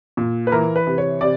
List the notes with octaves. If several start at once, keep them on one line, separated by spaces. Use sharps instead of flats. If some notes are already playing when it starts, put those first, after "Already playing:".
A#2
B4
E3 A#4
B4
C3
C#5
C3 D5